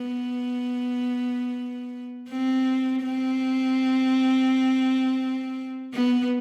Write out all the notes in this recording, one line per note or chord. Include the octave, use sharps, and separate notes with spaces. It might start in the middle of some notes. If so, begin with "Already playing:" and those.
Already playing: B3
C4
C4
B3